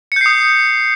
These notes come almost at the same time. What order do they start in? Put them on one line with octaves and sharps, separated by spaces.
C#7 G6 C7 D#6